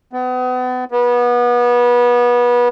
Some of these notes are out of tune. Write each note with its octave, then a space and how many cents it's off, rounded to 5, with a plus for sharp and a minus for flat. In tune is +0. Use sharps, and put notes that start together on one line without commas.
B3 +35
B3 -25